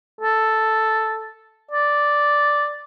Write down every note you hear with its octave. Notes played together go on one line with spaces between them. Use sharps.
A4
D5